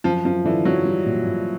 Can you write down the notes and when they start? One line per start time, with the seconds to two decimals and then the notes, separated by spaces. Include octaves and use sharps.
0.04 F#2 F3
0.25 F#2 F3
0.44 D3 E3
0.65 F#2 F#3
0.85 G3
1.06 A#2
1.26 A#2